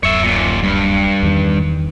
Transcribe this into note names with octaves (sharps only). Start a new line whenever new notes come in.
D1 F#2 C#5 E5
D#2 A#2
G2
E2 D#3